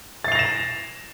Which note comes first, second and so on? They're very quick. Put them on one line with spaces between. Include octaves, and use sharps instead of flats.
A6 C7 F7 A#6 E7